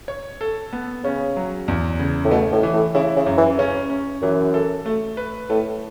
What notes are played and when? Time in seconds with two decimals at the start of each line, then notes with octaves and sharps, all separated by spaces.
0.08 C#5
0.41 A4
0.73 B3
1.04 C#3 C#4
1.37 F#3
1.68 E2
1.99 C#3
2.25 A2
2.31 B2 A3
2.53 A2
2.63 E3
2.74 A2
2.95 C#3 E4
3.16 C#3
3.26 F#2
3.38 E3
3.58 C#3 C#4
3.90 C#4
4.22 F#2 E3
4.54 A4
4.86 A3
5.17 B4
5.49 A2 A3